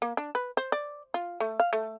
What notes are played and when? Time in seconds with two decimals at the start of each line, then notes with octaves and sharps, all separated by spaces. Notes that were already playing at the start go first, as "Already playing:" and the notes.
0.02 A#3
0.17 D4
0.35 B4
0.57 C5
0.72 D5
1.14 F4
1.40 A3
1.60 F5
1.73 A3